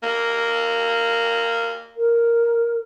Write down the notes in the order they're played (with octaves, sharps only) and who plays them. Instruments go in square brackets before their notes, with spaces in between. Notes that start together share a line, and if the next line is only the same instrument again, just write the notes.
[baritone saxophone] A#3
[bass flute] A#4